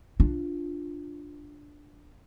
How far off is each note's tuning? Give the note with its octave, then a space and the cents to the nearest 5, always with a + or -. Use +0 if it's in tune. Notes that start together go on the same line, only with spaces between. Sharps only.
D4 +0 F4 +0